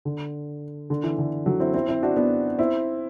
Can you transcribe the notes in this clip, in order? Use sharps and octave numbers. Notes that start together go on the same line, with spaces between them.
D3
D3
E3
D3
D3 F#3
C4 E4
C4 E4
C4 E4
D4 F#4
B3 D4
C4 E4